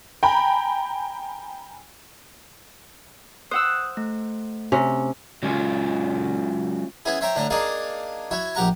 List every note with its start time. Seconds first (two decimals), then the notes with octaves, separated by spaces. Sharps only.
0.23 G5 G#5 A#5 B5
3.51 C5 F#5 D#6 E6 F#6
3.97 A3
4.72 C3 C#4
5.43 F#3 G#3 C#4 F4
7.05 B3 C#4 E4 G#4
7.21 C5 C#5 E5 G5 A#5
7.36 A2 D3 D4 A#5
7.50 A#3 D4 D#4 G#4 D5 F5
8.31 E4 F#4 C#5
8.55 A#1 G4 F#5 A#5 C#6